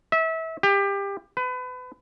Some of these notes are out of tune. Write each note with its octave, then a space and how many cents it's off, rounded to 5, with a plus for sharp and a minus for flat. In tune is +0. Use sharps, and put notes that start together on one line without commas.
E5 -25
G4 +25
B4 +30